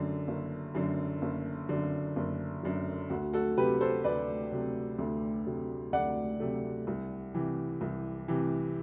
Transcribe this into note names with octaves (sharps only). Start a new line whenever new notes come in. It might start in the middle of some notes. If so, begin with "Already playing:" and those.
Already playing: F#2 D3
F#1
F#2 D3
F#1
F#2 D3
F#1
F#2 D3
D2 F#4
F#4 A4
C3 F#3 A3 G4 B4
A4 C5
D2 B4 D5
C3 F#3 A3
D2
C3 F#3 A3
D2 D5 F#5
C3 F#3 A3
C2
C3 E3
C2
C3 E3